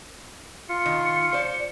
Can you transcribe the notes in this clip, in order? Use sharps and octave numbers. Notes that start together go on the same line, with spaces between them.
F4 C#7
D#3
C5 D5